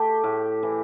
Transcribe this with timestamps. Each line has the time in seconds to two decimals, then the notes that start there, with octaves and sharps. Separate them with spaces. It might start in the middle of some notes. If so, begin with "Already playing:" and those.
Already playing: A3 G4
0.24 A2
0.63 E3